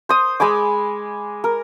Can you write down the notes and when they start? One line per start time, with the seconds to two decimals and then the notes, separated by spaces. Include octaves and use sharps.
0.09 C5 D#6
0.40 G#3 G#5 B5 D6
1.44 A#4